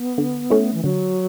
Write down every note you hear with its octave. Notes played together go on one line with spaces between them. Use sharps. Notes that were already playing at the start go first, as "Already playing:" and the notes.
Already playing: B3
D3
A3 C#4 E4
E3
D3 F#3